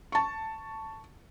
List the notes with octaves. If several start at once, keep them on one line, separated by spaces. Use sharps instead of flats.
A5 C#6